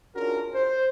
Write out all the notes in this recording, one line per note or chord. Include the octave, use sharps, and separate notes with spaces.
C#4 D4 F4 F#4 G#4 A#4
C5